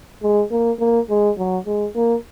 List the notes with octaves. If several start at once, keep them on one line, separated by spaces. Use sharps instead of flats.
G#3
A#3
A#3
G#3
F#3
G#3
A#3